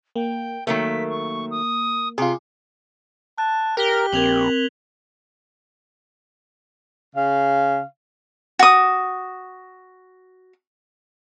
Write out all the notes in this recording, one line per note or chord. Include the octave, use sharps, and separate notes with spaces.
A#3 G5
D#3 F#3 A3 A#3 B6
C#6
D#6
C3 F4 G#4 C6
A5 F#6
G4 A#4 F#6 B6 G7
A#1 C4 A#4 G#6 F7 F#7
C#3 F5
F#4 D#6